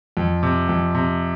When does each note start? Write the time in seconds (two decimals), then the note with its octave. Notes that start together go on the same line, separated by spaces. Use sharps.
0.17 F2
0.43 C3
0.69 F2
0.95 C3